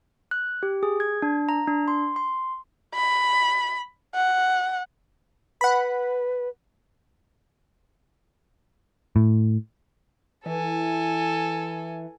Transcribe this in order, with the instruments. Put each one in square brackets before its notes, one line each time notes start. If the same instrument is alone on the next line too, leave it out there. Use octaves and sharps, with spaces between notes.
[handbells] F#6
G4
G#4
G#6
D4
A#5
D4
C6
C6
[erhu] B5
F#5
[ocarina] B4 [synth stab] F#5 B5
[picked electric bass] A2
[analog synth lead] E3 [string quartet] A4 G#5